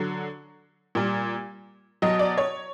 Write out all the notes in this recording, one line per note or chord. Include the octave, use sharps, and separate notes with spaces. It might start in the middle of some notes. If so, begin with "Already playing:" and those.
Already playing: D3 F#3
A#2 G3
B2 F#3 D#5
D5
C#5